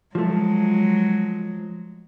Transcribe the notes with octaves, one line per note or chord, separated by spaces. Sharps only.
F3 F#3 G#3 A3